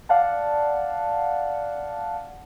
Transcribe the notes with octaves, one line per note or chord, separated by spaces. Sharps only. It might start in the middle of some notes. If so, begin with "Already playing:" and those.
D5 F5 F#5 A5